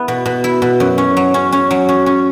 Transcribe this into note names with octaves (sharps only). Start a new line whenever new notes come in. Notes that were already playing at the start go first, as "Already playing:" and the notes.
Already playing: B3 E4
B2
B2
E4
B2
F#2
C#4
F#3
C#4
C#4
F#3
C#4
C#4